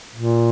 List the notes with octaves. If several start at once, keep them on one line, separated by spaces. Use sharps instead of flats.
A#2